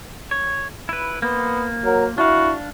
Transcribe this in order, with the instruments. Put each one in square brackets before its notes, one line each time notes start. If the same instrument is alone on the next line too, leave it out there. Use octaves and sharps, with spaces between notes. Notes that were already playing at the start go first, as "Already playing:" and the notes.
[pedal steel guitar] C#5
E4 B4
[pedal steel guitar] A#3 C5 [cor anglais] B3
[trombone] F#3 [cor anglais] A#4
[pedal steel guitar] D4 F5 [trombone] E4 [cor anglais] F#4